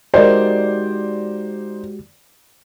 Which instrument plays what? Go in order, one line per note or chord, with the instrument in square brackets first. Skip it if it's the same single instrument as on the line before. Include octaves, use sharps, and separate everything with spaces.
[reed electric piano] G#3 F#4 G4 [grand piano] D#4 C5 [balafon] A#4 D#5 [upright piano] D5